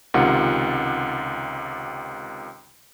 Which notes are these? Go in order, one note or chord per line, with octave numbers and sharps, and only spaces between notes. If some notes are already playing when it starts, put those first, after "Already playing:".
C#2 C3 D#3 F4 F#5